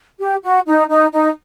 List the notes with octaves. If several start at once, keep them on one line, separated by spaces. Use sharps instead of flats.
G4
F#4
D#4
D#4
D#4